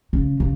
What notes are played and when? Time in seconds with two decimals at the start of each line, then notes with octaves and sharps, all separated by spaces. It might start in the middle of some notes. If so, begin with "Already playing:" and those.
0.13 C#3
0.40 C#3